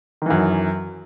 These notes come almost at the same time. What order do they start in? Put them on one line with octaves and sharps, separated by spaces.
D#3 E3 F#2